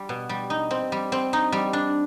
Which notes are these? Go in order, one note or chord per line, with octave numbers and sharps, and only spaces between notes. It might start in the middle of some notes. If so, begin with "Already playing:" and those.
Already playing: G3
B2
G3
D#4
C4
G3
C4
D#4
G3
D4